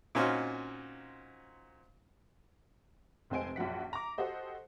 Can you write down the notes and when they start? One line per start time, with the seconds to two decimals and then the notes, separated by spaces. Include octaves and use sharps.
0.15 A#2 C4 C#4 D#4 F4 F#4
3.30 F1 C3 G#3 C5 G#5 D7
3.56 A#1 F#2 F#3 F#5 B6
3.93 A#5 D6
4.18 F#4 G4 A4 C5 D#5